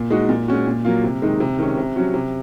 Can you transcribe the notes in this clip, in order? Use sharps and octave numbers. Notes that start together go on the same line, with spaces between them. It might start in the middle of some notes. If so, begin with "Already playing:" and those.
Already playing: A#2
G#3 D#4 F#4
A#2
G#3 C#4 F#4
A#2
F#3 A#3 F4
C3
D#3 G#3 D#4
C3
D#3 G#3 C#4
C3
F#3 C#4 F#4
C3